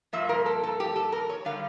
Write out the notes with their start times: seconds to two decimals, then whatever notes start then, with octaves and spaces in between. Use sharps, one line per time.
0.13 G2 F3 A#3 E5
0.29 A#4
0.46 A4
0.63 A4
0.80 G4
0.96 A4
1.12 A#4
1.29 C#5
1.45 D3 G3 F5